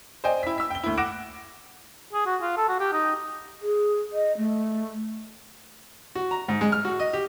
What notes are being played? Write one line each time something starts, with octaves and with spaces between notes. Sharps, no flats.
C5 D5 D#5 G5 G#5
E4 B6
E6 B6
G5 G7
D2 E4
F#5 D6 F#6 A#6 D7 E7
G#4
F#4
F4
A4
F#4
G4
D#4
G#4
D#5
A3
F#4
A#5
G#2
G#3
F6
F#4
D#5
G4